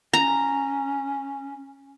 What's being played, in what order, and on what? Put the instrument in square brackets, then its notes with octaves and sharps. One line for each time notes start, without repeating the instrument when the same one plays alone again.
[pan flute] C#4 [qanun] A#5